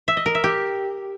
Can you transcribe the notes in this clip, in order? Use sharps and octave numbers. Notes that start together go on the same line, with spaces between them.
E5
D#5
A#4
E5
G4